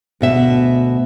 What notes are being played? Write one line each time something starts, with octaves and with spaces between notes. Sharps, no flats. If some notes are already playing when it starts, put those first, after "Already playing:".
D2 B2 E5